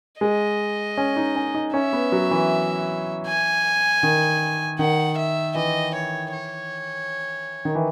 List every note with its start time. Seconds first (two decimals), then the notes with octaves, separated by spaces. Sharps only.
0.21 G#3 D#5
0.97 C#4
1.17 D#4
1.36 C#4
1.55 D#4
1.74 C#4 E5
1.93 B3
2.12 F#3
2.31 E3
3.27 G#5
4.03 D#3
4.79 D#3 F#5
5.17 E5
5.55 E3 D#5
5.94 C#5
6.32 C#5
7.65 D#3
7.75 E3